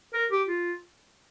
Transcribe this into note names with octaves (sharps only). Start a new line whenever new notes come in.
A#4
G4
F4